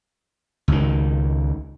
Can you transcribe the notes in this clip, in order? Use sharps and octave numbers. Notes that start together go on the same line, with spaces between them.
C#2 D#3